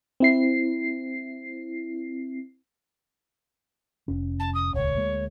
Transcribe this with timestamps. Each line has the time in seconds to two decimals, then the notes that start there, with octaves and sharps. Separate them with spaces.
0.20 C4 E4 C7
4.08 F1 C#4
4.39 A5
4.54 D#6
4.74 D#1 C#2 C#5
4.97 D2 G#3 A#3